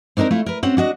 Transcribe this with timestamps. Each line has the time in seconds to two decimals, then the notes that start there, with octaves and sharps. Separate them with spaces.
0.17 C4 D4 D#4 G#4 A#4
0.31 A3 E4 F4
0.46 A#4 B4
0.63 C4 C#4 F#4
0.77 D4 F#4 D#5